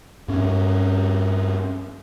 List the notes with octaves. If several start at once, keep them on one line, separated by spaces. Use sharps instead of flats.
G2 C#4